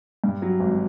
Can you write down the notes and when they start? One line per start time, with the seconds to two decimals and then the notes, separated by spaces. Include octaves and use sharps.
0.24 G2
0.42 F#3
0.60 G#1